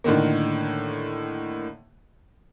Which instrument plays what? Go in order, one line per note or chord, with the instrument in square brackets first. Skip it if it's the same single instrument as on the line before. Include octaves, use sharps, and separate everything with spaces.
[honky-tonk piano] A2 D3 D#3 A#3